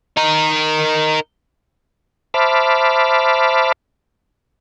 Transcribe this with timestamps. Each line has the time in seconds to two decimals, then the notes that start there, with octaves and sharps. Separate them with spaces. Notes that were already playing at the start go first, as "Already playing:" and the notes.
0.17 D#4 A#4
2.34 C5 E5 A5 B5 D6 F6